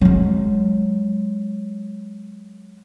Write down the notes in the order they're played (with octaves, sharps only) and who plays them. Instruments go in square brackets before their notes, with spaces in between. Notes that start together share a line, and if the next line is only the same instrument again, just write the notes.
[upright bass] F#3 G#3